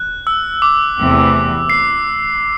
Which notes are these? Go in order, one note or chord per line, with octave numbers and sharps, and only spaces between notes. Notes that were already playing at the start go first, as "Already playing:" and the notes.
Already playing: F#6
E6
D6
E2 C3 E3 A3 C4
C7